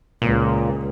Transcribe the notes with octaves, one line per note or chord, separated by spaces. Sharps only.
C#2 A#2